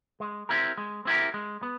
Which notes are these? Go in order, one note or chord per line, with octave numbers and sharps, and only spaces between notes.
G#3
C4 E4 G4 A#4
G#3
C4 E4 G4 A#4
G#3
B3